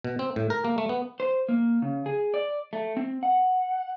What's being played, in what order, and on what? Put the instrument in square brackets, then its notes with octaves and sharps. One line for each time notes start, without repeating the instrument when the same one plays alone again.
[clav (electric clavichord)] B2
C4
A2
A#4
A#3
A3
B3
[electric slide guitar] C5
A#3
C#3
G#4
D5
A3
C4
F#5